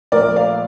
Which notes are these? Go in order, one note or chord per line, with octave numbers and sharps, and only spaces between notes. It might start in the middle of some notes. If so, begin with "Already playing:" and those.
A#1 A#2 A3 A#4 D5
D5 F5